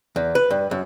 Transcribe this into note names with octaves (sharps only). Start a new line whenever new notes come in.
E2
B4
G2
F#2